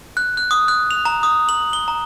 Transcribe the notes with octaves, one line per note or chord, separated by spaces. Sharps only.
F#6
F#6
D#6
F#6
F7
A#5
D#6
F#7
G7
A#5